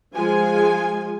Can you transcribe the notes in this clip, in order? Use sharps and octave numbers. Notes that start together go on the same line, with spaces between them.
F3 G#3 F4 G#5